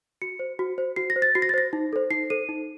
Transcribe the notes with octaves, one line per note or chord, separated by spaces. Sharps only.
F#4 C#7
C5
F#4
C5
F#4 C7
A#6
C5
A6
F#4 C7
A#6
A6
C5 A#6
D#4
A4 C5
D#4 C7
A4 C5 D#7
D#4